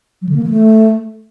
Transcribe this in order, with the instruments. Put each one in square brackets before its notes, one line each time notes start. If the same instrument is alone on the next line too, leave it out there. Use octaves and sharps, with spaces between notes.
[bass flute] F#3
D3
A#3
E3
A3